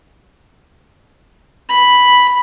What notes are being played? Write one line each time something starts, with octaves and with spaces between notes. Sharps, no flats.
B5